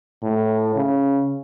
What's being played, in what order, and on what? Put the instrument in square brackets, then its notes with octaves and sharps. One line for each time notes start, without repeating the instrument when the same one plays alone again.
[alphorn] A2
C#3